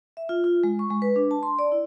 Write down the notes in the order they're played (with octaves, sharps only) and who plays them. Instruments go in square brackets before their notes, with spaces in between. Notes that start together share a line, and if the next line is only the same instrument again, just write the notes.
[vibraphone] E5
F4
F4
G#3
C#6
G#3
B4
D4
A5
C6
D5
E4